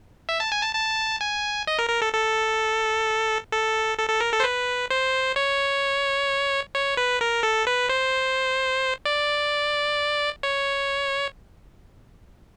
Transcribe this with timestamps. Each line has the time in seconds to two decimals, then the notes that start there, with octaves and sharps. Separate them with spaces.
0.29 E5
0.40 A5
0.52 G#5
0.63 A5
0.75 A5
1.21 G#5
1.67 D#5
1.79 A#4
1.90 A#4
2.02 A4
2.13 A4
3.52 A4
3.98 A4
4.09 A4
4.21 A#4
4.32 A4
4.40 C5
4.44 B4
4.91 C5
5.36 C#5
6.74 C#5
6.97 B4
7.21 A#4
7.43 A4
7.67 B4
7.89 C5
9.05 D5
10.43 C#5